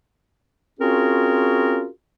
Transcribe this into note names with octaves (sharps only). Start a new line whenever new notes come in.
C4 C#4 F4 F#4 G#4 A#4